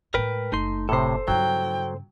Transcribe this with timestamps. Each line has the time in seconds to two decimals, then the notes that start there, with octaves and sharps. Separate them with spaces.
0.14 A2 G#3 A#4 B4 G5
0.52 F#1 A3 D#4 C6
0.89 A2 C3 A4 C5
1.28 G2 C#3 F#3 G5